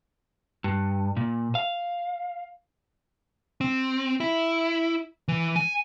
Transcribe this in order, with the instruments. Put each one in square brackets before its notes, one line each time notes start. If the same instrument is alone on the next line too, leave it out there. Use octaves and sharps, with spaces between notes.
[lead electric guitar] G2
A#2
F5
C4
E4
E3
G#5